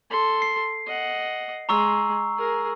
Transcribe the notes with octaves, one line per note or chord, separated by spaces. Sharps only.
A4 C6
C7
D#5 F#5
G#3 A#5 C#6 E6
G#4 A#4